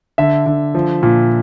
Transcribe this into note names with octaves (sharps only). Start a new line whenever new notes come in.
D3 E5
D3
F3
A#2